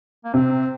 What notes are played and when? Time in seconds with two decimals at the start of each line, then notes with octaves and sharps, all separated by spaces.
0.25 A#3
0.34 C3 C4